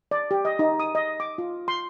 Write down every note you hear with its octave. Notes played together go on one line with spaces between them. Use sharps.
D5
G4
D#5
D#4
D#6
D#5
D6
F4
C6